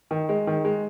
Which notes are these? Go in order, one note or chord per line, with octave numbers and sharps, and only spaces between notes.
D#3
G#3
D#3
G#3